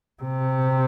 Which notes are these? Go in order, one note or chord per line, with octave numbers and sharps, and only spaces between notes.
C3